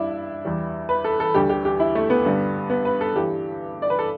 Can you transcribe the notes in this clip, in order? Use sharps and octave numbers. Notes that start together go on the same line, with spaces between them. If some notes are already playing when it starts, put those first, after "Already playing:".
Already playing: G2 G3 D4 E4
E2 E3 G3
B4
A4
A4
D2 D3 G3 G4
G4
G4
E4
A3
B3
G2 D3 G3
B3
B4
A4
G2 E3 G3 G4
D5
B4
A4